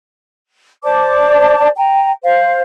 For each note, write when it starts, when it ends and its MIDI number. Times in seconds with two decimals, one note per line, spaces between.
0.83 1.68 72
0.83 1.68 74
0.83 1.68 81
0.83 1.68 86
1.76 2.11 79
1.76 2.11 82
2.23 2.62 72
2.23 2.62 77